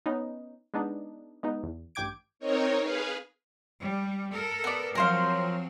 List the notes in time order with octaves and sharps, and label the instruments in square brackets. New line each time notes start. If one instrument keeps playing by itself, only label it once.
[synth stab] B3 C#4 D#4
G#3 B3 D4 D#4
G#3 B3 D#4
E2
A1 G2 G5 D6 G#6 D7
[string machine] C4 D#4 A#4 C#5
G#4 B4 F5
[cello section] G3
A4 A#4
[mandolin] B3 D5
[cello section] F3 F#3 C4 [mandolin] A#4 C5 F5